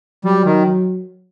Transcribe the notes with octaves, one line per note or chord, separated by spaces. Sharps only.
F#3 G3
D#3